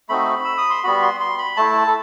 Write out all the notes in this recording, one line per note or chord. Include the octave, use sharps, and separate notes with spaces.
A3 C4 D#4 F#4 B5
E6
D#6
C6
G3 B3 F#4 B5
C6
C6
B5
A3 E4 A5
A4